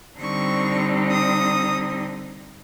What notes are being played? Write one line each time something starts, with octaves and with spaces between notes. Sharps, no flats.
D3 G3 C4 D#4 C#6
D#6